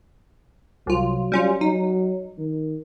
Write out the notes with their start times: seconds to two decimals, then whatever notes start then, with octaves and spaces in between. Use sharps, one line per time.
0.87 C2 F#3 F4
1.32 G3 C#4 F4
1.61 F#3 D#4
2.38 D#3